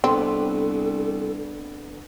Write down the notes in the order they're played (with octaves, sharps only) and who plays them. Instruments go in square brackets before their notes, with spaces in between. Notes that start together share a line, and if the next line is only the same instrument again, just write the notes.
[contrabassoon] C2 [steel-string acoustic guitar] B3 D4 B4 [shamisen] C4 [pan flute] A4